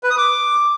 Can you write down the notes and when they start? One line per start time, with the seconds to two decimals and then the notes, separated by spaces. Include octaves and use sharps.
0.03 B4
0.11 D#6
0.18 D6